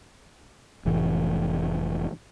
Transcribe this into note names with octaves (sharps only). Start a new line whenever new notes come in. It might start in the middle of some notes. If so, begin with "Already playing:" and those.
F1 A2 E3